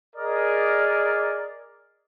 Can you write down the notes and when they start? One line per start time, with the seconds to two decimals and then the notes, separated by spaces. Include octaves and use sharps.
0.15 G#4 A#4 D5 D#5